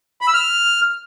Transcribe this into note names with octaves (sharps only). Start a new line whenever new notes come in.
B5
E6
F6